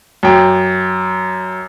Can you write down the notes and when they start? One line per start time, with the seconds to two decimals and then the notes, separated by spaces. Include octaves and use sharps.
0.23 F#2 G5